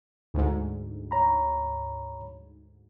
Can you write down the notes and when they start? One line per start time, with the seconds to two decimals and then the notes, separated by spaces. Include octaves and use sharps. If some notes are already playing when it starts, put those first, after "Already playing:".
0.34 D2 G#2
1.11 C#5 A#5 B5